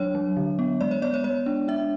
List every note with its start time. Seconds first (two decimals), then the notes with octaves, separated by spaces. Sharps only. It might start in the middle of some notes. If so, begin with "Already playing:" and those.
Already playing: F#3 D4 C#5
0.15 F#3
0.37 D3
0.59 B3
0.81 G#3 D5
0.91 C#5
1.02 B3 D5
1.14 C#5
1.24 G#3 C#5
1.46 D4
1.68 D4 E5